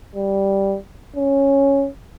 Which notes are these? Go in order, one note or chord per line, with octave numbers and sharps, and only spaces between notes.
G3
C#4